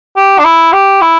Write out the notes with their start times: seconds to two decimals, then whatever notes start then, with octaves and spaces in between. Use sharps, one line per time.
0.16 G4
0.39 D4
0.45 E4
0.73 G4
1.01 E4